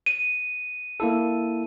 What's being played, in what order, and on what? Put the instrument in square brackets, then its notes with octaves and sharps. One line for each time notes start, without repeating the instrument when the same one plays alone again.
[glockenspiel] D#7
[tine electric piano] A#3 E4 A4